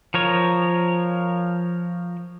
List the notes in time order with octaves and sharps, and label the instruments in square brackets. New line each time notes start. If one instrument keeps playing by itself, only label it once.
[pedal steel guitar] F3 A#4 C#5